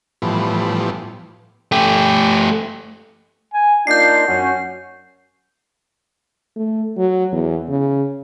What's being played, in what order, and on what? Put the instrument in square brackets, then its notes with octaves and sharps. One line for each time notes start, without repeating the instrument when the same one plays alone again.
[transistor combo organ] A2 E3 F3 G3 B3
[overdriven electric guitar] A3 G4
[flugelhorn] G#5
[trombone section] A#3 D#4 F4 [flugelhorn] D4 [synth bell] G6 C7
[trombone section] F#2 C#4 [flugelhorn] F#4
[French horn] A3
F#3
E2
C#3